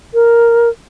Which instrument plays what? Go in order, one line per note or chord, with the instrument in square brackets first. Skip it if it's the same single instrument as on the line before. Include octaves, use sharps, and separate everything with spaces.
[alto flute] A#4